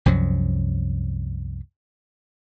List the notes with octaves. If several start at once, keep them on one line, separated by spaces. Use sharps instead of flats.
C2 F#2 F3 F#3